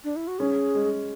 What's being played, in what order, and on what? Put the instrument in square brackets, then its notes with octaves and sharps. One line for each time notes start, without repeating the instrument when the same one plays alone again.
[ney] D4
E4
F#4
[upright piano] C#4 [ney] G#4
[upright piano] G#3